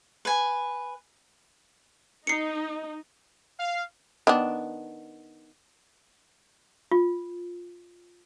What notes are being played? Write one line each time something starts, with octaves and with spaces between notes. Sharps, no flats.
B4 G#5
D#4 C7 C#7
F5
D#3 B3 D4
F4